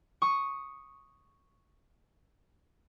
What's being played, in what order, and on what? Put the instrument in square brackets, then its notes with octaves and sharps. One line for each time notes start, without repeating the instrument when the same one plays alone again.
[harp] C#6 D#6